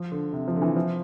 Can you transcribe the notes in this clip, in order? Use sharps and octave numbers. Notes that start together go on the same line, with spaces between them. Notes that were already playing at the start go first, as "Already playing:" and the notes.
Already playing: F3
D3
C3
F3
D3
E3
F3